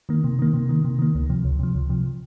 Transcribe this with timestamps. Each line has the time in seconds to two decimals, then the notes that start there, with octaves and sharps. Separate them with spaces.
0.09 D#3 A#3
0.24 C3
0.39 D#3 A#3
0.54 C3
0.69 D#3 A#3
0.85 C3
0.99 D#3 A#3
1.15 C#2
1.30 C3 F3
1.44 C#2
1.59 C3 F3
1.75 C#2
1.90 C3 F3